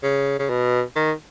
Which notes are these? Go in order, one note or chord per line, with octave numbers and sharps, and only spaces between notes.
C#3
C#3
B2
D#3